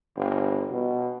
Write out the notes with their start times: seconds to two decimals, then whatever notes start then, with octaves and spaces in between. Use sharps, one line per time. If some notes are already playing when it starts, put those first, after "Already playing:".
0.16 G1
0.71 B2